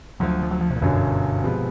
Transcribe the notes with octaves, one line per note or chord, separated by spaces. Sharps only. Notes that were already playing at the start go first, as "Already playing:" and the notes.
D2 D3 F3 F#3
F3
F#3
F3
C3
A#2
G1 F#2 B2 D3 F#3
C3 F3 G#3 B3